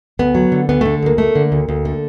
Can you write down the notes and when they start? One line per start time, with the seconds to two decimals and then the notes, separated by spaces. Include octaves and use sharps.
0.19 D2 B3
0.35 F#3
0.52 D3
0.69 D2 B3
0.81 D3 A3
1.03 D2 A#3
1.18 A3
1.35 D3
1.52 D2
1.69 D2
1.85 D3